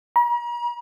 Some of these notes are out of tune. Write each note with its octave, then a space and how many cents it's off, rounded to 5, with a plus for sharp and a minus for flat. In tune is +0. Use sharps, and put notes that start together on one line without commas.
A#5 +45